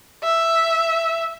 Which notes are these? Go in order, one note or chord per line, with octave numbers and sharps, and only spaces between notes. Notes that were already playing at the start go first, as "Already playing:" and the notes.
E5